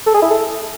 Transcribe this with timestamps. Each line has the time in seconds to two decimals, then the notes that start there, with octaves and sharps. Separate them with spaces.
0.06 A4
0.14 G#4
0.22 E4
0.30 A4